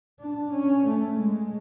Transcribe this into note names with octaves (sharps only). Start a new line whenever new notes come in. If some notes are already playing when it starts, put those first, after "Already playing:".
D4
C#4
A3
G#3